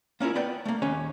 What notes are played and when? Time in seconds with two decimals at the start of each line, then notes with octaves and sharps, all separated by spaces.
0.20 A#3 C#4 E4 F4 A#4
0.35 B3 B4 D5 G5
0.66 A3 A#3
0.82 D#2 C#4 C#5 G#5